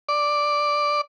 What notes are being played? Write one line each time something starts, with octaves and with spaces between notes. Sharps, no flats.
D5